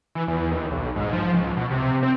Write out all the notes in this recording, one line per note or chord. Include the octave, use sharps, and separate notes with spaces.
E3
E2
D#2
B1
G#2
F3
C#2
B2
C3
C4